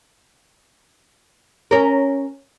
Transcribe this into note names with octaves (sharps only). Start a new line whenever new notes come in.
C#4 A#4